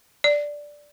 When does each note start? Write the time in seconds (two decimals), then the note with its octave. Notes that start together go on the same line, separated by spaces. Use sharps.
0.24 D5